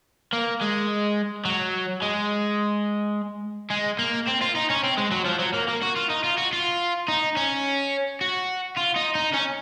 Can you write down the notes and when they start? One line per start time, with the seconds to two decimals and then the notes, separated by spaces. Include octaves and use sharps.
0.33 A#3
0.61 G#3
1.45 F#3
2.02 G#3
3.71 G#3
3.99 A#3
4.27 C4
4.41 F4
4.55 D#4
4.70 C#4
4.83 C4
4.97 G#3
5.11 F#3
5.26 F3
5.39 F#3
5.54 A#3
5.68 A#3
5.82 F#4
5.96 F4
6.10 D#4
6.24 F4
6.38 F#4
6.53 F4
7.08 D#4
7.37 C#4
8.21 F#4
8.77 F4
8.96 D#4
9.15 D#4
9.34 C#4